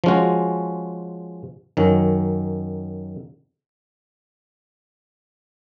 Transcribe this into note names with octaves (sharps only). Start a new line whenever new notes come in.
F3 G#3 C#4 F#4
F#2 D#3 F#3 C#4